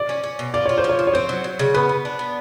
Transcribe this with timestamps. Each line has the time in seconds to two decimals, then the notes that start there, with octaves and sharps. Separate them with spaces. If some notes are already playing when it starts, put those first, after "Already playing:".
Already playing: D5
0.09 C#4
0.24 C#4
0.39 B2
0.54 F4 D5
0.66 F4 C#5
0.78 C5
0.84 F3
0.89 C#5
0.99 F3
1.07 C#5
1.14 C4 C5
1.29 F#3
1.44 F#3
1.59 C#3
1.74 B3 B4
1.89 B3
2.05 D4
2.19 B3